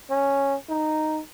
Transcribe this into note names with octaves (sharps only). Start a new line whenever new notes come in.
C#4
D#4